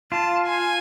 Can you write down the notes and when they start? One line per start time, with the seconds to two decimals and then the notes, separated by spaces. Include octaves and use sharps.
0.12 F4 A5
0.46 G#5